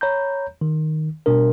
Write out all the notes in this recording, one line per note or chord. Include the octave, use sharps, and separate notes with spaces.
C#5 A#5 B5 G6
D#3
B2 G3 D4 A#4